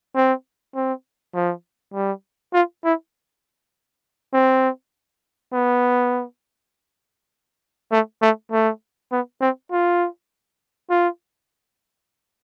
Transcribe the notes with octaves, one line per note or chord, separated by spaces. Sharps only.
C4
C4
F3
G3
F4
E4
C4
B3
A3
A3
A3
B3
C4
F4
F4